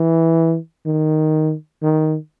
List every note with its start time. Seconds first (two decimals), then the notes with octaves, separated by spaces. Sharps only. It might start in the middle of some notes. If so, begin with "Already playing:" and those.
Already playing: E3
0.86 D#3
1.83 D#3